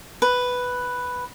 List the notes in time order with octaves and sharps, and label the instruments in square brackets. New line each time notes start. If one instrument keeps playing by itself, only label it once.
[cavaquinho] B4